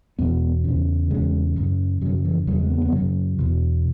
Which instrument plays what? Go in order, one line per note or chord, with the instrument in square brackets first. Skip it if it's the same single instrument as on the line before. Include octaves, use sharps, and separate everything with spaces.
[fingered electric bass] E2 B2 B3
E2 C#3
E2 C#3 G#3
F#2 C#3
F#2 F#3
C#3
E3
E2 C#3 F#3
G#3
B3
B3
F#2 C#3 F#3
E2 B2